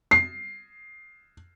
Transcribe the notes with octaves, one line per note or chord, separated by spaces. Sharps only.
C7